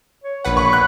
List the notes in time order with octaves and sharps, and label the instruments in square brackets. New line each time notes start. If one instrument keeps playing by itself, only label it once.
[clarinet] C#5
[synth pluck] A#1 B4 F#5
[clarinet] B5 [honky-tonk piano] C#6
[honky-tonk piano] F#6